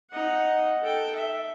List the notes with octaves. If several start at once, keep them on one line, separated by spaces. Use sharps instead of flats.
D#4 F#5
A4 G5
E5